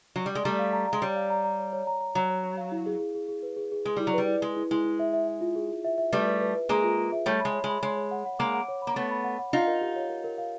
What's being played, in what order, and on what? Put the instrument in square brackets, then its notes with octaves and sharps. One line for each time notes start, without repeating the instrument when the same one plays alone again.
[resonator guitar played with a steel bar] F#3
G3
G#3
[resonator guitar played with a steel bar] G3 A3 [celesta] A#5
[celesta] F5
A#5
A#5
[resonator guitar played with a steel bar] G#3
[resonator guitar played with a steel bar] G3 [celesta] C#5
[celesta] F5
A#5
A#5
C#5
C#5
A#5
A#5
[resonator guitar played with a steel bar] F#3 [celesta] C#5
[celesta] C#5
C#5
F5
E4
G#4
G#4
G#4
G#4
B4
G#4
G#4
[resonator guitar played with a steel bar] G#3 [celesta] G#4
[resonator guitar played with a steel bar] G3 [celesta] E4
[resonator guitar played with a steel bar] F#3
[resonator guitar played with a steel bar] G3 [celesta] B4
[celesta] E4
[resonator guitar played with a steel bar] G#3 [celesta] G#4
[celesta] E4
[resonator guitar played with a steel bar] G#3 [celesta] E4
[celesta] E4
E5
E5
E5
F4
G#4
G#4
E5
E5
[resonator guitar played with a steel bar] G3 A3 [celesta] B4
[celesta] B4
B4
B4
[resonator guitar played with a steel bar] G#3 A#3 [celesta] G#4
[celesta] F4
F4
E5
[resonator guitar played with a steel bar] G3 A3 [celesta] C#5
[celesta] B5
[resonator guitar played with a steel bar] G#3
[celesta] C#5
[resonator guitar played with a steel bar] G#3
[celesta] B5
[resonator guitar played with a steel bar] G#3 [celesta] C#5
[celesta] C#5
F#5
F#5
[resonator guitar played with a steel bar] G#3 A#3 [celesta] D6
[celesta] F#5
C#5
B5
[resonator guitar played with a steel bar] A#3
[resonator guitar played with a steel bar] A3 B3 [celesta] C#5
[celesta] B5
F#5
F#5
[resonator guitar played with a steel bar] D#4 F4 [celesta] F5
[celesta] A#4
G4
C#5
A#4
A#4
F5